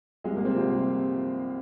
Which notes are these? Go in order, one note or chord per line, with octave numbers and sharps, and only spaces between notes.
C2 C3 F3 G#3
A#2 A#3
C3 C4
C2 C3 F3